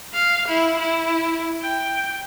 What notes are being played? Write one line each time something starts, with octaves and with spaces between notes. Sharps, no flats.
F5
E4
E4
G5